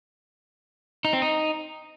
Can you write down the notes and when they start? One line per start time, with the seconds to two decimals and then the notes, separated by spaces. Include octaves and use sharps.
1.05 D#4
1.13 C4
1.22 D#4